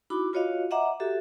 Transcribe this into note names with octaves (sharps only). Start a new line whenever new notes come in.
D#4 E4 F#4 B5 D6
F4 F#4 C#5 D#5 F5
D#5 E5 F#5 A#5 D6
F#4 G4 A4 E5